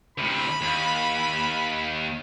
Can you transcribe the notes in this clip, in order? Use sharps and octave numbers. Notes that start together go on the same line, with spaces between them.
D2 C3 B5
D#2